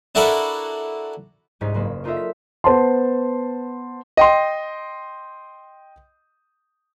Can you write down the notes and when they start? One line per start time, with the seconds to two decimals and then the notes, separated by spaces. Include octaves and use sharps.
0.15 D4 E4 F#4 A4 A#4 B5
1.61 C2 G#2 C#4 D#4 B6
1.74 F#1 A#3 B5 E7
2.04 D4 D#4 F4 A4 A#4 E5
2.17 B6
2.64 B3 C5 A5 C6
4.17 D#5 G5 C6